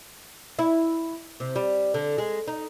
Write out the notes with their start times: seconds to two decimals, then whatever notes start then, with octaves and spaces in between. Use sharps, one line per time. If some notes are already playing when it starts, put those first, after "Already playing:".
0.59 E4
1.40 C3
1.56 G3
1.94 D3
2.18 G#3
2.48 D#4